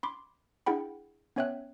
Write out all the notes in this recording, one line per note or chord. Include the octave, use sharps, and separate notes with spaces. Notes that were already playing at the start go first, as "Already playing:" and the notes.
B5 C6 D6
D4 E4 G#4 F#5 G5 B5
B3 C#4 C#5 E5 G5 F#6